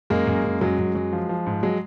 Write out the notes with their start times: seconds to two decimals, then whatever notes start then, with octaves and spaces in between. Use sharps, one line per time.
0.10 F#2 G#3 A#3
0.27 F#2
0.44 F#2
0.61 F#2 F#3 G#3
0.78 F#2
0.95 F#3
1.13 F3
1.29 F3
1.46 G#2
1.63 F#3 G#3